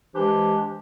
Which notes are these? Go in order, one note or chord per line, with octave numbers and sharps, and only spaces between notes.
E3 G#3 D4 G4 C5